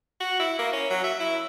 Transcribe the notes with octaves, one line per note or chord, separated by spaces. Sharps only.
F#4
E4
A#3
C#4
F#3
E5
E4